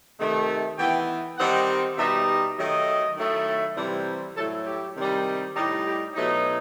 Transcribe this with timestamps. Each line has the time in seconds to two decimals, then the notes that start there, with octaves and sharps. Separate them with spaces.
0.19 C3 D#3 A3
0.78 E3 B3 E4 G5
1.38 D#3 G3 C4 D#4 F#5
1.97 B2 G3 D#4 E5
2.57 D#3 F#3 A3 D#5
3.16 D#3 F#3 A3 E4
3.77 C3 E3 G3 C4 E4
4.36 A2 F#3 A3 A4
4.66 G4
4.96 C3 D#3 G3 D#4
5.56 A2 G3 D#4 G4
5.86 G4
6.15 B2 F#3 A3 D#4